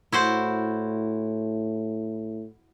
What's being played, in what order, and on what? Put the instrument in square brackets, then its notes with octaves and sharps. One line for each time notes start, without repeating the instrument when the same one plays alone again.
[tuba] A2 [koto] E4 F#4 C5